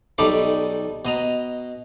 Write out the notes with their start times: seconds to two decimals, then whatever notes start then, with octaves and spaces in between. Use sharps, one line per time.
0.18 B1 G3 D#4 A4 D5 B5
1.05 B2 D#5 A#5